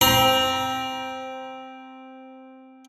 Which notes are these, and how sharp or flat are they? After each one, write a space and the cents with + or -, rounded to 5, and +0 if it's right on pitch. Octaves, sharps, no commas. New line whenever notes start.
C4 +0 A#5 +30